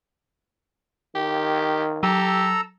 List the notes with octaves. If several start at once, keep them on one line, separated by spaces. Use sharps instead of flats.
D#3 G4
F#3 G4 A4 A#5 E6